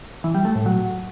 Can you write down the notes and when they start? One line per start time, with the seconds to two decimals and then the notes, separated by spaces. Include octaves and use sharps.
0.24 E3
0.35 G3
0.45 A3
0.55 A2
0.66 F#3